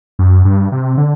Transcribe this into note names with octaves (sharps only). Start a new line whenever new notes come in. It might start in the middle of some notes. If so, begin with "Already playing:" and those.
F#2
G2
C3
D3